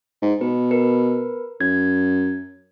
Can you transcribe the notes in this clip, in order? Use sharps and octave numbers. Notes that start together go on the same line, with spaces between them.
G#2
B2 B4
A#4 B4
F#2 G#6